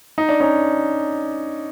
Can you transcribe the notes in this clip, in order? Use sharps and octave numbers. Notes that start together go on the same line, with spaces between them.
D#4
D4
C#4 D#4